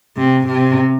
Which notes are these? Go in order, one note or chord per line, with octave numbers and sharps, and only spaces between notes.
C3
C3